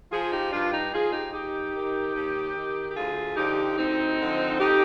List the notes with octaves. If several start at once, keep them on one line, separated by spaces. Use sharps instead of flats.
F3 F4 G#4
D#4 G4
G2 D4 F4
D#4 G4
F3 F4 G#4
D#4 G4
D#2 D#4 G4
D#3
D#2
D#3
G4
D2 F4 G#4
D3 F3 D#4 G4
D2 C4 D#4
D3 F3
F2 D#4 G4